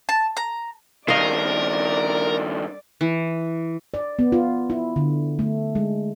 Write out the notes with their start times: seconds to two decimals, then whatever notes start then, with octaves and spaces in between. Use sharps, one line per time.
0.09 A5
0.37 A#5
1.08 G2 D#3 A#4 D5 D#5 F5
3.01 E3
3.94 D5
4.19 B3
4.32 F4
4.70 E4
4.96 D3
5.39 A3
5.75 G#3